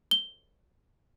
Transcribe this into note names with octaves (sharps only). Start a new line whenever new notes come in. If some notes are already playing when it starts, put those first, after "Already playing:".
G7